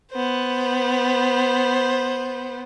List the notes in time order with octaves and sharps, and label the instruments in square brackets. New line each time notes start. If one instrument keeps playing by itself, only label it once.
[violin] B3 C5